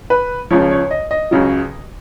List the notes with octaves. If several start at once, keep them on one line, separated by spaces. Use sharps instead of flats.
B4
C#2 C#3 F3 C#5
C#5
D#5
D#5
C#2 C#3 F#3